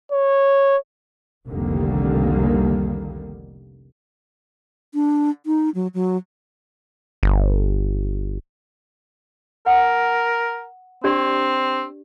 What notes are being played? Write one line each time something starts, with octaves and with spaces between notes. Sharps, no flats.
C#5
F1 C2 D3 D#3 G3 A#3
D4
D#4
F#3
F#3
G1
A#4 F#5 D#6
C4 D4 G4 D5